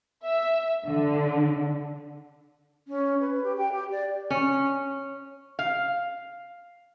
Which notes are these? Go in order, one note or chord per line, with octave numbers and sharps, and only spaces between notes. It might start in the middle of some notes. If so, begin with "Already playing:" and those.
E5
D3
C#4
B4
G4
G5
G4
D5
C#4
F5